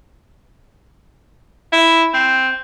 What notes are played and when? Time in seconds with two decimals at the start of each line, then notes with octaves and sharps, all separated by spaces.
1.73 E4
2.14 C4